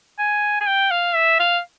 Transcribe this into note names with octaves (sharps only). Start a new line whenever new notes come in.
G#5
G#5
G5
F5
E5
F5